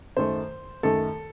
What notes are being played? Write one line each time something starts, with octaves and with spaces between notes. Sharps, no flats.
F#2 D#3 A3 C5
F#2 D#3 A3 A4